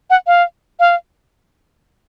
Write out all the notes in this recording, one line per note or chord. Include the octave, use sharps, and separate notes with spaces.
F#5
F5
F5